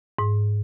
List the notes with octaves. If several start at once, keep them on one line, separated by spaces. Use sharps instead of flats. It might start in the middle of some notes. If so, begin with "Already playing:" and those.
G#2